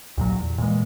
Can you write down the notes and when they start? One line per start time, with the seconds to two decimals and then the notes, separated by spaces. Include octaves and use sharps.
0.17 D#2 A#2 F#3
0.35 E2
0.58 A#2 E3 G#3